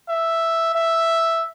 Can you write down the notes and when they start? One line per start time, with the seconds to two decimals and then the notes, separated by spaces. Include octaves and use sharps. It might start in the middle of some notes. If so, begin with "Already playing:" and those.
0.08 E5
0.75 E5